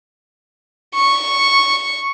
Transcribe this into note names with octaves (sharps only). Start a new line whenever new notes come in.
C#6